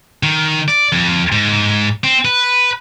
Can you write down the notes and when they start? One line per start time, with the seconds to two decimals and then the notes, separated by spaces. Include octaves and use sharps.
0.23 D#3
0.68 D5
0.92 F2
1.32 G#2
2.04 C4
2.25 B4